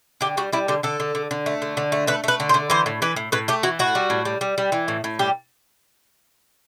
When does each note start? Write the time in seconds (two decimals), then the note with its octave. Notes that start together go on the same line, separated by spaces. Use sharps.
0.21 D3 G4
0.37 G3 F#4
0.53 G3 E4
0.68 D3 G4
0.83 D3 A4
1.00 D3
1.15 D3
1.31 D3
1.46 A3
1.62 D3
1.77 D3
1.92 A3
2.07 A3 B4
2.24 A3 B4
2.40 D3
2.49 C5
2.54 D3
2.70 E3 C5
2.86 A2
3.02 E3 B4
3.16 A2
3.32 A2 B4
3.48 A3 G4
3.63 E3 F#4
3.79 A2 F#4
3.95 G3
4.10 A2
4.25 G3
4.41 G3
4.58 G3
4.72 E3
4.88 A2
5.04 A2
5.19 G3 G4